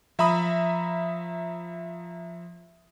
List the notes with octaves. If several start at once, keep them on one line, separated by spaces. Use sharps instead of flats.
F3 E5 A#5 B5 D#6